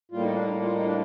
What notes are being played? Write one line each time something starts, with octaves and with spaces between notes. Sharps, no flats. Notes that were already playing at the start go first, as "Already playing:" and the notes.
A2 G3 A#3 F4
D#4
D4
D#4
F4
D#4
D4